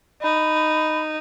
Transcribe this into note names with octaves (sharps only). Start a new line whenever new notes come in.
D#4 B5